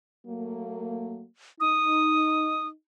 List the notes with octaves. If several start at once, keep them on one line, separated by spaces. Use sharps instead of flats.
F#3 A3 A#3
D#4 D#6